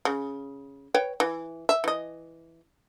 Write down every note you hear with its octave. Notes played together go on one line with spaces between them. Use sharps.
C#3
B4 C#5 G5
E3
E5
E3 D#5